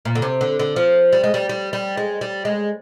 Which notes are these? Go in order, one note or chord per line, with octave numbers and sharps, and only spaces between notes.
A#2
D3
C3
D3
D3
F3
G3
G#3
G3
G3
G3
G#3
G3
G#3